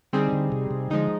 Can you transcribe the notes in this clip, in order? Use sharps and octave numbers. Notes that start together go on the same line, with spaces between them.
D3 G3 C4 D#4 G#4
D3
C3
C3
D3 F3 G#3 D#4